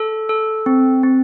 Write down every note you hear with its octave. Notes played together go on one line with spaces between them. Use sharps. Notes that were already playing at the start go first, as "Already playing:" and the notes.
Already playing: A4
A4
C4
C4